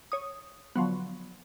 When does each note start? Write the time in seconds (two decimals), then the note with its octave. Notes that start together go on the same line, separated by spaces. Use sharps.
0.12 C#5 D#6
0.76 D3 F3 F#3 B3